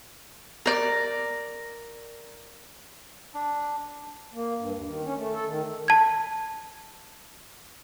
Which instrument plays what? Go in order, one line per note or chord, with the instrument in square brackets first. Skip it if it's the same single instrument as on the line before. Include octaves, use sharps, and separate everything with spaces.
[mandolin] A#4 D5
[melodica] D4
[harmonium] A#3
G2
D#2
D#3
C#4
A3
A4
D#3
[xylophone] A5 G#6